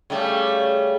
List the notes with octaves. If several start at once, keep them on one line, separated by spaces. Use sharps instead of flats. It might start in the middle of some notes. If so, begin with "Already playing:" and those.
C#3 G3 A3